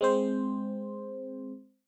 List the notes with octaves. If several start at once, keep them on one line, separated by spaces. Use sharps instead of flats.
G#3 C4 C5